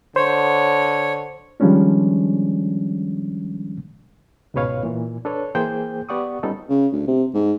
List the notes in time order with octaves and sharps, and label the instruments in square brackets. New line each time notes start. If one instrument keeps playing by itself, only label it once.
[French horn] D3 [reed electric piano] C5 [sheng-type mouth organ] C#5
[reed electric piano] D#3 F3 G3 G#3 C#4 D4
C#2 G#2 B2 B4 C#5 F5
A#2 E3
D4 A4 B4 C#5
E3 A#3 G#4 C5 G5 G6
B3 G4 D5 F#5 C#6 D#6
G3 B3 C#4 D#4 F4 A4
[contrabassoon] C#3
D2
C3
G#2